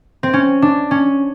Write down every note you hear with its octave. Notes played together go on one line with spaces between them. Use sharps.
C4
C#4
D4
C#4